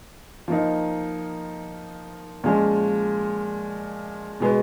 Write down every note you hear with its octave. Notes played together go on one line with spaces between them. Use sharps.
F3 A#3 D#4
A#2 F3 G#3 C#4
B2 G#3 B3